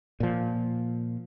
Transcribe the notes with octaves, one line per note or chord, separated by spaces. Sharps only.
A#2 F3